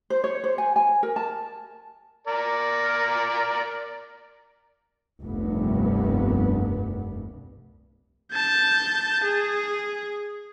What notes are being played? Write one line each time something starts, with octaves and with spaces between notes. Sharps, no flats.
C5
C#5
C5
G#5
G#5
A#4
A5
A#4 D5
F1 C2 G2 B3
A5 G6
G#4